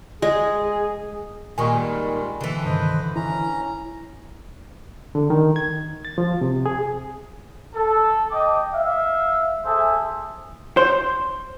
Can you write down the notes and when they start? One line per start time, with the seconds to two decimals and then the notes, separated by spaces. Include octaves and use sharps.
0.22 G#3 G#4
1.58 A#2 D#3 G3 G#3 G#5 C#6
2.41 D3 E3
2.65 G2 C3 D#3 B4 C5 D#5
3.16 C#4 E4 A#5
5.15 D3
5.30 D#3
5.56 G#6
6.05 A6
6.18 F3
6.41 C3
6.66 G#4
7.74 A4
8.31 D#5 G5 D6
8.73 E5 F5
9.65 G#4 A4 C5 E5
10.77 C5